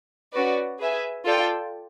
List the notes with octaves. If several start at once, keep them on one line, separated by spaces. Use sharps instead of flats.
C#4 F#4 B4 D5
G#4 B4 E5 G#5
F4 A4 D5 G5